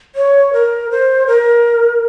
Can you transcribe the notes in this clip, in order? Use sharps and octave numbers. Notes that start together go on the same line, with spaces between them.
C#5
A#4
C5
A#4